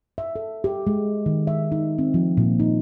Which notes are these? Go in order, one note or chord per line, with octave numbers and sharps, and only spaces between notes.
E5
A4
G4
G#3
D#3
E5
D#4
C4
F3
A#2
D#4